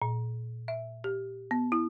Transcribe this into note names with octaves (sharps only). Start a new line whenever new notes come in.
A#2
E5
G4
B3
E4